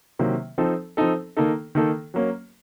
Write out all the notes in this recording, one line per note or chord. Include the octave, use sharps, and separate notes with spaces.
C3 D#3 F#3 A#3
F3 C4 D#4 A4
F3 C4 D#4 A4
D#3 A#3 D#4 A4
D#3 A#3 D#4 A4
F#3 A#3 C#4